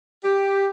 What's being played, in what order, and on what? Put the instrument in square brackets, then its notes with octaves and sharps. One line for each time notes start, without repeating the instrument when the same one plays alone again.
[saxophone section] G4